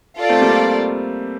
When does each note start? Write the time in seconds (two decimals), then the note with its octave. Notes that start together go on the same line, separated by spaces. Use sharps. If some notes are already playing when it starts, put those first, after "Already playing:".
0.18 F4 A4 D5
0.29 A3 C4
0.42 G3 A#3